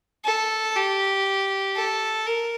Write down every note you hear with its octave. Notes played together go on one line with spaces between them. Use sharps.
A4
G4
A4
A#4